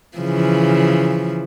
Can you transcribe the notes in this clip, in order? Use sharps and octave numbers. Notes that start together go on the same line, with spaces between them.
C#3 E3 F3